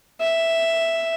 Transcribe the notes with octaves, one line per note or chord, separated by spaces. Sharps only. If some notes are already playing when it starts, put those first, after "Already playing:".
E5